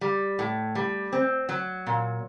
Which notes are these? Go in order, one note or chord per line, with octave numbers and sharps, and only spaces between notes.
G3
A2
G3
C4
F#3
A#2